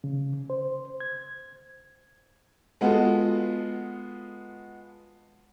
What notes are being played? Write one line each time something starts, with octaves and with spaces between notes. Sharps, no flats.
C#3
C5
G#6
G#3 B3 F4 F#4 A4